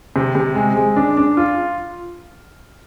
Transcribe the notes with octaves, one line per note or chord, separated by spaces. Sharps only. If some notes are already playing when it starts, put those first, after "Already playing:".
C3
C3
G#3
G#3
D4
D4
F4